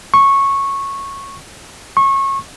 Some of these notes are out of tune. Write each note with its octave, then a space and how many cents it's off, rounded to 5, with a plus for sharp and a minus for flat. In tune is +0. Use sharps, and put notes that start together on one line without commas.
C#6 -10
C#6 -25